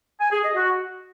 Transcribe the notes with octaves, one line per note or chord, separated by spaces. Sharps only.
G#5
G#4
D#5
F#4